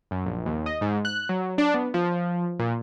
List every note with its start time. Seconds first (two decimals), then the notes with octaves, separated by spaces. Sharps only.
0.11 F#2
0.26 A#1
0.46 D#2
0.66 D#5
0.81 G#2
1.05 F#6
1.29 F#3
1.58 D4
1.74 B3
1.94 F3
2.59 A#2